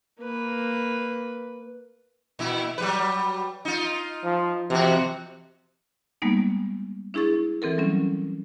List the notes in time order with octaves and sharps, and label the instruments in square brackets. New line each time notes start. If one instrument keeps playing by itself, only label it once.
[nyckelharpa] A#3 B4
[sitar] A#2 E4
F#3 G3 B4
D#4 F4
[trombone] F3
[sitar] E2 F#4 [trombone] C3
[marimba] G3 G#3 A#3 B3 D#4
D4 E4 G#4 C#6 A6
E3 C4 A4 A#4
F#3 G3 C#4